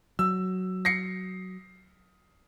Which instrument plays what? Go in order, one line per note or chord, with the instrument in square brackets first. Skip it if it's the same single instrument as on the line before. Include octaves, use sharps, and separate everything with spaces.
[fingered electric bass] F#3 [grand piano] E6
[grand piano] A#6 C7 C#7